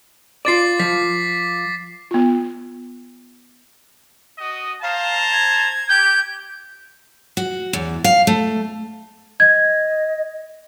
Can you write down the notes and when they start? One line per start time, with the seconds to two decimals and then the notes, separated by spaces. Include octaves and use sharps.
0.45 F4 D5 D6 A6 C7
0.79 F3 B6
2.11 B3 F4
4.38 F#4 D#5
4.82 C5 F5 A5 A#5
5.33 G#6
5.89 G4 G6
7.37 F#4
7.73 E2
8.04 F5
8.27 A3
9.40 D#5 G#6